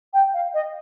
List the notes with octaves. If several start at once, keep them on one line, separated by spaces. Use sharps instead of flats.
G5
F5
D#5